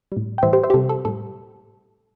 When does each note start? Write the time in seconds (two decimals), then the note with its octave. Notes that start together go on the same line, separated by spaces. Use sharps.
0.12 G3
0.17 A2
0.38 G5
0.43 A2 E3 G3 C5 E5
0.53 G4 C5
0.64 C5 E5
0.70 G4
0.74 C3 G3 A4
0.89 A4
1.05 A2 G3 A4